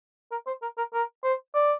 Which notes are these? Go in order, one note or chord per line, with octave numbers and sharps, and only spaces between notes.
A#4
C5
A#4
A#4
A#4
C5
D5